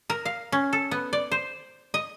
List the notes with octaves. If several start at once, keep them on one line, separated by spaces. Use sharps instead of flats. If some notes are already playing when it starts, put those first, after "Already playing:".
A#4
F5
C#4
A4
B3
D5
C5
D#5